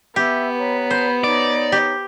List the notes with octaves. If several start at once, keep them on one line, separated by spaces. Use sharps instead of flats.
B3 G4 E5 E6
B4 C#5 A#5
C5
D#4 C#5 D5
G4